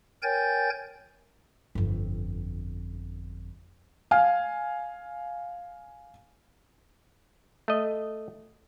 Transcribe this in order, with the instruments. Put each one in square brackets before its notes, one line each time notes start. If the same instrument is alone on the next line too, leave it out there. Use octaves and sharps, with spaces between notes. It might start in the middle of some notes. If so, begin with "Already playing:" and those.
[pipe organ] A#4 C#5 G5 G#5 G6 A6
[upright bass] G1 F2
[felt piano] F5 G#5 F6
[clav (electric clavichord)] A3 D#5